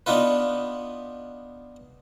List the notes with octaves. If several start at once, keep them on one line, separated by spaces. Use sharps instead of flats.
B3 D4 D#4 F4 B4